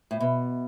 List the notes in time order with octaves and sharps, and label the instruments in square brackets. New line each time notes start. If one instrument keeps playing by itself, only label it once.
[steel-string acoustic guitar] A2
B2